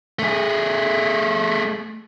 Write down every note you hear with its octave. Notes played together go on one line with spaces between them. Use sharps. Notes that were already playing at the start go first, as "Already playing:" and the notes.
A3 G#4